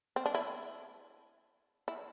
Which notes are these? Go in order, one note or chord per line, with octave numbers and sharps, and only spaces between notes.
C4
D4
E4
E4